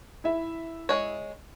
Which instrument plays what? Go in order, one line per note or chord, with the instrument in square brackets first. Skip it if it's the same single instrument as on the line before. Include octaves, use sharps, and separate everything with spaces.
[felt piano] E4 E5
[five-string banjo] G#3 C#5